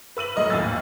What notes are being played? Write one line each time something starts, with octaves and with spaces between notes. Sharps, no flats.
B4 E6 D#7 F#7
A2 F#3 D#5 F6
G#1 D#2 F4 G#5 E6 A6